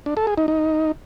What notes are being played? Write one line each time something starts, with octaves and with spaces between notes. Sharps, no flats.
D4
A4
G#4
D#4
D#4